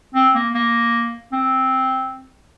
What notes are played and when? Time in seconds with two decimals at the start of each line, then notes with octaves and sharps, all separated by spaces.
0.15 C4
0.35 A#3
0.55 A#3
1.33 C4